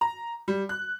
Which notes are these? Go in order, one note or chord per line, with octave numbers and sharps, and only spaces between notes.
A#5
G3
F#6